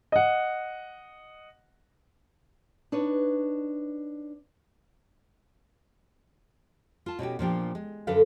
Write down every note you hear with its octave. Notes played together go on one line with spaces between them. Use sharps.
D#5 F#5
D4 D#4 B4 C#5
F4 A5
B2 C#4 F#4 G4
A#2 F3 D4 G4
G#3
F#2 D3 A4 B4 F5